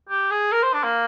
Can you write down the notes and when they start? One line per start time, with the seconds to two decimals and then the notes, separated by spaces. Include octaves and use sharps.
0.09 G4
0.31 G#4
0.52 A#4
0.63 C5
0.74 D4
0.84 A#3